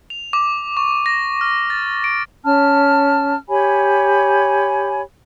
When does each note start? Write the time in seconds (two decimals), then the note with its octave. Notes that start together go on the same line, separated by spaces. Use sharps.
0.10 F7
0.33 D6
0.77 C#6
1.06 A#6
1.41 F6
1.70 A6
2.04 D7
2.44 C#4 A5 F6
3.49 G4 C#5 G#5 B5